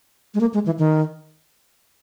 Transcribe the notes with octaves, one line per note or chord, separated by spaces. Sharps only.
G#3
A#3
G#3
E3
D#3